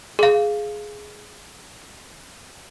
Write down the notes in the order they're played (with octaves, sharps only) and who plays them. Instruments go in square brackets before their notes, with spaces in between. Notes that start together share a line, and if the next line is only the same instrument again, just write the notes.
[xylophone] G#4 F5